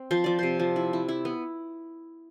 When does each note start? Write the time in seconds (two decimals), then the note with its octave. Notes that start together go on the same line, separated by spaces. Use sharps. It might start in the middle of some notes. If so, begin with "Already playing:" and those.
Already playing: C4
0.11 F3 C5
0.24 F3 D5
0.39 C3 C5
0.60 F3
0.76 E4
0.93 E4
1.08 E4
1.25 B3